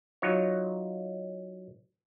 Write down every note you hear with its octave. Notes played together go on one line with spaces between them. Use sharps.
F#3 D#4 F4 C#5